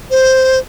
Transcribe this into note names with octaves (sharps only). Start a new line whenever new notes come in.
C5